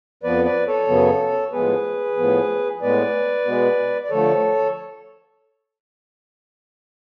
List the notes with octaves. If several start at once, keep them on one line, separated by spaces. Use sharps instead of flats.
F2 F3 B3 B4 D5
B4 D5
A4 C#5
F#2 C#3 F#3 B3
A2 F3 G#3 B3 G#4 B4
A2 F3 B3
A2 G#3 B3 B4 D5
B2 G#3 B3
D5
D3 F3 A3 A4 C#5